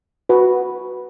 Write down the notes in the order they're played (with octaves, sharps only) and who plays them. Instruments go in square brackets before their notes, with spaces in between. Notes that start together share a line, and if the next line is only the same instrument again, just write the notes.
[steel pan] F#4 B4